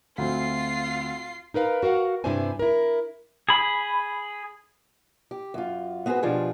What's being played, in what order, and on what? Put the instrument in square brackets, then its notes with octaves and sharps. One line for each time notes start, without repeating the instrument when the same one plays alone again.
[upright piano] D2 C4 [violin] F4 C7
[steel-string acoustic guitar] D#4 A#4 B4 F5
F#4 A#4 F5 F#5
G2 C3 D4 E4 C5 G#5
E4 A#4
[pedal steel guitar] G#4 B5
[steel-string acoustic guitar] G4
F#2 F4
B3 C4 F#4 G#4 B4
B2 F3 D4 F4 G4 G#4